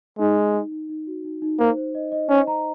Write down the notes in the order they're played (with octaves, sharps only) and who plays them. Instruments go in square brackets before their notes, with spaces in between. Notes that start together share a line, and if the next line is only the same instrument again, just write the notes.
[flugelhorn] G#3 [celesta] D#4
[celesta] D#4
D#4
D#4
D#4
F#4
D#4
D#4
[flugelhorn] A#3 [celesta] C5
[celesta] C5
D#5
D#5
[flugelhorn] C#4 [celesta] C5
[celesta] A#5